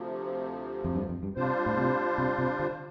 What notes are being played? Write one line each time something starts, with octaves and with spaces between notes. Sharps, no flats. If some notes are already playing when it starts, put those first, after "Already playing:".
Already playing: D2 C3 F3
F2
G2
F2
G2
C3 G3 D4 F4 C5
A2
C3
C3
C3
D3